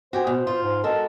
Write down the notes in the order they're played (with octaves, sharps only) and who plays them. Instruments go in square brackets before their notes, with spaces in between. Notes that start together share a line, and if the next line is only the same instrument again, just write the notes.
[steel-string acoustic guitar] F#4 G4 G#5 [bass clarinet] C5
[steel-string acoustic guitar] B2
F4
[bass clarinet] G#2
[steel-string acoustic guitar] G#3 F#4 A#4 [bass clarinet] A4